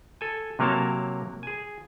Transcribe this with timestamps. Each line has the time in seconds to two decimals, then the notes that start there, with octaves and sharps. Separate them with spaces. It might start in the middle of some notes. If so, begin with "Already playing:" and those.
0.21 A4 G#5
0.59 C3 F#3 A#3 A#4 C#5 A5
1.43 G#4 G#5